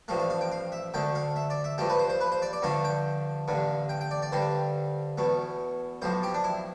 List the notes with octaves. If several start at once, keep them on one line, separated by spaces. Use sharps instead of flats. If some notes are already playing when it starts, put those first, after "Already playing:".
A1 G2 F3 A3 F5
F5
F5
G5
F5
E5
D2 D3 A3 G5
F5
E5
D5
E5
G2 F3 A3 G4
B4
C5
C5
B4
C5
D5
D5
G2 D3 F3 A3 F5
G5
A1 G2 D3
G5
G5
D5
D5
G2 D3 G3 C5
E2 B2 A3
B1 A2 F3 C5
G4
D4
E4